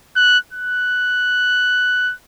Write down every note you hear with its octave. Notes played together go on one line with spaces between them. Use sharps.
F#6
F#6